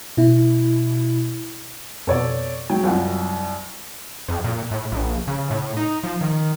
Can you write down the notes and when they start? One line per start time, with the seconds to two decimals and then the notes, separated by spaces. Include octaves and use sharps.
0.17 B2 E4
2.07 F2 B2 A4 C#5 D5
2.70 F#3 G#3 G5
2.84 C2 F#2 F#3 F4 F#5
4.29 F2
4.44 A#2
4.71 A2
4.92 A#1
5.27 C#3
5.51 A2
5.77 D#4
6.04 F3
6.21 D#3